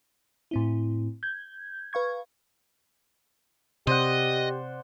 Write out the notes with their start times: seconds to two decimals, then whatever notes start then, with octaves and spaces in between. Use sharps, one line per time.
0.51 A2 C4 E4
1.23 G6 G#6
1.93 B4 F5 C#6 G#6
3.87 C3 G4 C5 D5 D#5 F#5